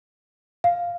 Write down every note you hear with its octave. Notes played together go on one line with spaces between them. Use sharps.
F5